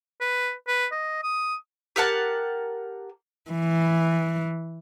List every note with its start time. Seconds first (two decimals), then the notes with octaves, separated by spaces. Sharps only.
0.20 B4
0.67 B4
0.91 D#5
1.23 D#6
1.96 G4 A#4 F#5 A5
3.51 E3